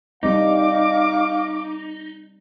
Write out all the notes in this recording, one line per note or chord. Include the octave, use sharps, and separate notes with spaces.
G3 C4 D#4 F5 D6